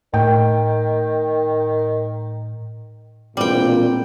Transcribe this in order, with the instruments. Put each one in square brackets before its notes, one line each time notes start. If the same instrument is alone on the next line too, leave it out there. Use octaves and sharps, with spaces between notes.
[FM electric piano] A2 [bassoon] D#3 [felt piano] G5
[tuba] E1 [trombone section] A#2 [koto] G3 G5 [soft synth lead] C4